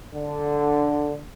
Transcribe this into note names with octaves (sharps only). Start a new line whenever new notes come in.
D3